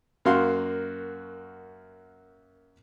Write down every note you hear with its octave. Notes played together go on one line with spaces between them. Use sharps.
F#2 A#3 F#4 F5 C6